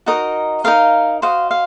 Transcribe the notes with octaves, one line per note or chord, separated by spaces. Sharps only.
D#4 F#4 A#4 D#5
D#4 F#4 A#4 D#5 F5
F#4 C5 D#5 F5
F5